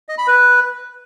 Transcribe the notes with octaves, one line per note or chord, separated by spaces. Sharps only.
D#5
B5
B4